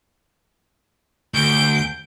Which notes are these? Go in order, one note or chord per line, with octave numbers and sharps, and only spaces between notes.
D2 G6 D7